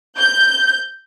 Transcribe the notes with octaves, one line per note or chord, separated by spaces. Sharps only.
G6